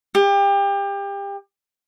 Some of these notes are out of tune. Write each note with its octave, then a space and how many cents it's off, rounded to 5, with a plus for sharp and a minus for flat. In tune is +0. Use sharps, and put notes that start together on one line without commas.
G4 +30